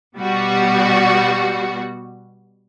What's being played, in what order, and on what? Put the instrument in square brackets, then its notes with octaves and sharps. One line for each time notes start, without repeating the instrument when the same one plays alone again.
[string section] B2 G3 F#4